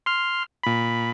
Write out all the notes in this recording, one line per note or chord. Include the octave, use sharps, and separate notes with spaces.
C6 F6
A#2 B5